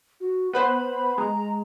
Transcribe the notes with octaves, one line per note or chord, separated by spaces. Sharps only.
F#4
B3 B4 C5 B5
G#3 A#5